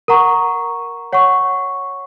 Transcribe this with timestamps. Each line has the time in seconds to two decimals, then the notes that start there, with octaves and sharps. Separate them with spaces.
0.08 A#4 F#5 A#5 C#6
1.13 C#5 F#5 C#6